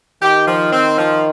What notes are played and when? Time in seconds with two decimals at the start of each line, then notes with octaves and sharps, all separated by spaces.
0.22 D#3 G4
0.47 F3
0.72 C4
0.97 F3